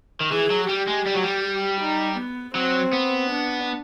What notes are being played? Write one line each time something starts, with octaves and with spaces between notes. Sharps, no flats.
D#3
E3 G#4
F#3
G3 G4
G#3
G3
F#3
G3
D#4
B3
F#3 C4
B3
D4